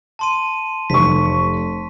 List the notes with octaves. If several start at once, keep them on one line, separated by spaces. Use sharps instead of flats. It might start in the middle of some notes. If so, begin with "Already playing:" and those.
A5 C6 D#7
F1 C#6 B6